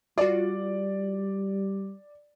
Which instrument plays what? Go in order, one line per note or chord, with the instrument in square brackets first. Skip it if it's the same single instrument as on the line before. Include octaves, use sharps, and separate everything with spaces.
[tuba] G3 [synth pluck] F4 F#4 [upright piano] D5